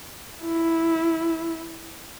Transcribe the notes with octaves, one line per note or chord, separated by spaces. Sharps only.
E4